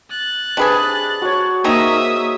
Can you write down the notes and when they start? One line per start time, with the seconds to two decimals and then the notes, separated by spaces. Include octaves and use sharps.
0.10 F#6 A6
0.57 C3 D4 G#4 B4 G#5
1.22 F#4 C#5
1.64 A#3 C4 D#4 E5 A#5 D#6